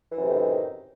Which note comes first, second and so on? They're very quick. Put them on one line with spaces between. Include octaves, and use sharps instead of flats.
E3 F#2 C3 A2 D#3